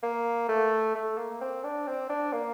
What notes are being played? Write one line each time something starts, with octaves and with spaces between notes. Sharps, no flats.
A#3
A3
A3
A#3
C4
D4
C4
D4
A#3